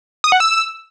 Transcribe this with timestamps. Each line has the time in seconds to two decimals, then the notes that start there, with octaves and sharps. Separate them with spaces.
0.24 D#6
0.32 F#5
0.40 E6